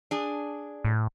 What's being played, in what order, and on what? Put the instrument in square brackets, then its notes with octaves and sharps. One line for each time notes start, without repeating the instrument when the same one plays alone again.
[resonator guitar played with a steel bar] D4 G#4
[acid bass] A2